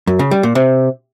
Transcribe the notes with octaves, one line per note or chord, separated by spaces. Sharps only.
F#2
C#3
G3
A#2
C3